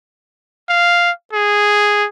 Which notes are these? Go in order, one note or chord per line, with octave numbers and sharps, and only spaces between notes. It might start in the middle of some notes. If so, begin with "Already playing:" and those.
F5
G#4